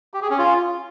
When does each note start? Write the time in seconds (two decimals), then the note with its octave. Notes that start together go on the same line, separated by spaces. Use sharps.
0.14 G4
0.22 G#4
0.30 C#4
0.38 F4